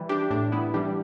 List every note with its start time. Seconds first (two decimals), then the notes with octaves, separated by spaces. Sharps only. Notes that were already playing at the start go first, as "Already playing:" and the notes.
Already playing: E3 G3
0.09 D4 G4
0.30 A2 D4
0.52 B3 E4
0.74 E3 G3 D4 G4